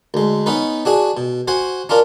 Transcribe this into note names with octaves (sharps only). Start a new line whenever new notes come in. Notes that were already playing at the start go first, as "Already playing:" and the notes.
D2 G#3
B3 C#4 D#4 B4
D4 F#4 G#4
B2
F#4 C5 F#5 G#5
C#4 D4 F4 A#4